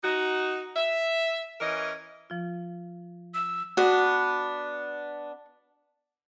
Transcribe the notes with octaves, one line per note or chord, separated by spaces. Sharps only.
D#4 F#4
E5
E3 C#4 A#4 D#5
F3 F4
E6
B3 D4 F#4